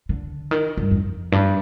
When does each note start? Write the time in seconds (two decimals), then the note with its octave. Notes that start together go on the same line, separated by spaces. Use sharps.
0.09 D3
0.51 D#3
0.77 G2
0.91 F2
1.32 G2